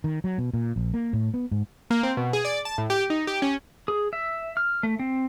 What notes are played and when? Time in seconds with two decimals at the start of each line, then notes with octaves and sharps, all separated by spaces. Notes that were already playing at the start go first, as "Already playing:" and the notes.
0.04 D#3
0.24 F#3
0.38 B2
0.54 A#2
0.76 A#1
0.94 A#3
1.13 A2
1.34 B3
1.51 G#2
1.91 A#3
2.03 C4
2.17 B2
2.33 G#4
2.45 D5
2.65 A5
2.78 A2
2.90 G4
3.10 D#4
3.27 G4
3.42 C#4
3.88 G#4
4.13 E5
4.57 F6
4.83 A3
4.99 C4